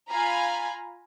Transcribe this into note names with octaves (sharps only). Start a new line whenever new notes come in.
F4 F5 G#5 A#5 B5